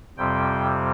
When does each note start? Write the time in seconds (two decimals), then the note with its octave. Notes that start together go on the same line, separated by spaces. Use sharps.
0.17 F2 C3 G3 C4 G5